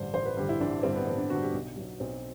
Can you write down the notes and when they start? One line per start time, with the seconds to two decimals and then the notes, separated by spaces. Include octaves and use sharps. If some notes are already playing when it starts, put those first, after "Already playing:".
Already playing: A1 G2 D3 C5
0.14 A1 C5
0.26 B4
0.37 G2 D3 G4
0.49 E4
0.61 A1 D4
0.83 G2 D3 C4
0.96 B3
1.07 A1 C4
1.18 D4
1.30 D3 F#4
1.34 G2
1.42 G4
1.53 B1
1.76 B2 F#3
2.00 B1 C4